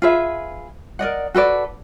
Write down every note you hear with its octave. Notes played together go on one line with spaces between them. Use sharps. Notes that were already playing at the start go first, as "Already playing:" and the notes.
F4 G#4 B4 E5
A#4 D5 D#5 F#5
F#4 A4 B4 D5